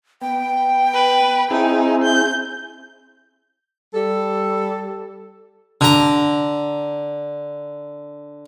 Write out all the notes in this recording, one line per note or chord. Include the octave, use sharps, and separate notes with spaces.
B3 G5
B4
C4 D#4 E4 G#4
G6
G3 A4
D3 A#5